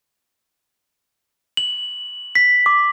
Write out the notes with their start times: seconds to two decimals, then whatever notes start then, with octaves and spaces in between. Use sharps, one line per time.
1.57 F#7
2.35 B6
2.66 D6